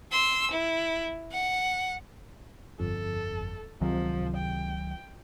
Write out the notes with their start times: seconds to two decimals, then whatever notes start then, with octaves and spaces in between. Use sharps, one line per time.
0.12 C6 E6
0.51 E4
1.32 F#5
2.80 G1 F2 A4
3.81 C#2 C3 D#3 F3 F#3 G#3
4.37 G5